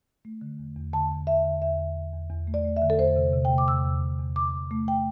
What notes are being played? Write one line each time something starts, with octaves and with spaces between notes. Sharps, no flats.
A3
D3
E2
E2
D3 A5
E2
E2 E5
D3
E2 E5
D3
E2
E2
E2
A3
D5
A3
E5
D3
A4
E2 C5
C3
C3
G5
A3
D6
E2 E6
E2
E2
E2
E2 D6
E2
A3
G5